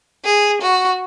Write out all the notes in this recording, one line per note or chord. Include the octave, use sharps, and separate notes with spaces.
G#4
F#4